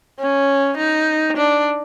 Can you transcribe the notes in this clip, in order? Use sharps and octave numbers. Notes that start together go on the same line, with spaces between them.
C#4
D#4
D4